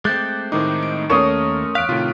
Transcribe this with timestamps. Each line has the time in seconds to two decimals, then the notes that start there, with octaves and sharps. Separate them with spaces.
0.05 G#3 A3 C4 D6 F#6 G6 A6
0.52 A2 D#3 D#4 C5 D6
0.83 D7
1.10 D#2 A3 C#4 A4 A#4 C#5 C6 D#6
1.75 E2 F5 F6 F#6 B6 D7
1.89 A2 C3 D#3 F4